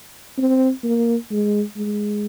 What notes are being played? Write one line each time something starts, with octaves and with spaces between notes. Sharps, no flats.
C4
A#3
G#3
G#3